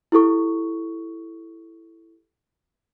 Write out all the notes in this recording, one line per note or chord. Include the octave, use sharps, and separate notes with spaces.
E4 G4 A4 C#6